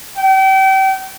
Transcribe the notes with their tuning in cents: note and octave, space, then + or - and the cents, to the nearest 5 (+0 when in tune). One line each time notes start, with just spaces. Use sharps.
G5 -35